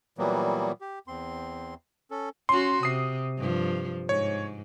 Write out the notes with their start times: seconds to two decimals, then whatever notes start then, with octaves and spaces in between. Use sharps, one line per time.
0.18 A#2 E3 F#3 G3 A#3 B3
0.81 G4
1.08 E2 C4 C6
2.11 C#4 A4
2.49 C#4 F#4 C6
2.83 C3 D#6 C7
3.38 G2 F3
4.09 G#2 C#5